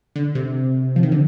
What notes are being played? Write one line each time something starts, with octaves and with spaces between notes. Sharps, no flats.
D3
C3
F3
D#3
D3